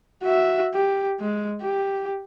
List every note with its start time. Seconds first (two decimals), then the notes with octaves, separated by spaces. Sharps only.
0.23 F#4 E5
0.74 G4
1.20 G#3
1.62 G4